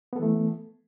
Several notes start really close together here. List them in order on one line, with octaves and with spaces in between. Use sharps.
B3 A4 E3 A3